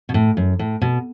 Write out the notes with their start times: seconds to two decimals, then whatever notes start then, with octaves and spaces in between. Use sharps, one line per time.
0.09 B2
0.14 A2
0.37 F#2
0.59 A2
0.81 B2